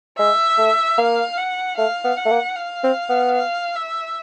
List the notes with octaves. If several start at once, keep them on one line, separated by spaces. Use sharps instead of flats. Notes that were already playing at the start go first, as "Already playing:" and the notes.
G#3 E5
A3
A#3 F5
F#5
A3 F5
B3
F#5
A3
A#3
F5
C4
B3
F5
E5